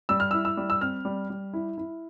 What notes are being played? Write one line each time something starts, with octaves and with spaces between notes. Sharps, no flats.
G3 E6
F6
E4 E6
E6
G3
E6
C4 F6
G3
G3
E4
E4